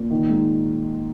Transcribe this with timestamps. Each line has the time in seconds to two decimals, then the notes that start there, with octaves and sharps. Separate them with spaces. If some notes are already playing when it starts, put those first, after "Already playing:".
Already playing: A#2
0.11 D#3
0.30 G#2